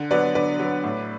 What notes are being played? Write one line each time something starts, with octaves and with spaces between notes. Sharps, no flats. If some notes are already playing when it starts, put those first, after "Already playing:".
Already playing: D3
F#3 B3 B4 D5
D3 B4 D5
F#3 B3
A2